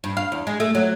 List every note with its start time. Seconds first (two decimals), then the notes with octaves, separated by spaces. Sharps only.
0.04 G2
0.17 F5
0.32 E2
0.47 G#3
0.60 A3
0.75 F#3